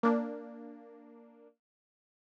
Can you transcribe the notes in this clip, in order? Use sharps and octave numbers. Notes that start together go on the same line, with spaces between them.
A#3 D4